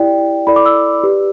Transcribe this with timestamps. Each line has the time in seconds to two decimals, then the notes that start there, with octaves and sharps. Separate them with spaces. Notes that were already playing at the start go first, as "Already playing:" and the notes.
Already playing: E4 G4 D5 G5
0.47 E4 A4 D5 B5
0.56 D6
0.66 E6
1.04 G4 B4 D5